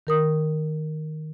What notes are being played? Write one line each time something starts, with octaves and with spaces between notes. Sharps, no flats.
D#3 A#4 D#6